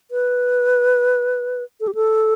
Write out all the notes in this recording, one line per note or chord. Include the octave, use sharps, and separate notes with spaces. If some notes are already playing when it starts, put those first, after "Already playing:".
B4
A4
G4
A4